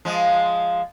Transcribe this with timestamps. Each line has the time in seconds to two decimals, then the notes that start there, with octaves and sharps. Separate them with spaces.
0.05 F3 G#3